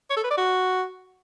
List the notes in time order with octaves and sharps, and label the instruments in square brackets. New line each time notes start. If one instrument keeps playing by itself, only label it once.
[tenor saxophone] C#5
A4
B4
D5
F#4